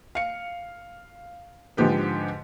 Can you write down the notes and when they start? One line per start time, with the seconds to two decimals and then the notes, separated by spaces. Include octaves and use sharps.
0.15 F5 C#7
1.77 G#2 D3 F3 G4 B4